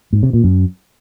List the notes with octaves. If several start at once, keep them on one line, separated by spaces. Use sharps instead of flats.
G#2
C3
A#2
F#2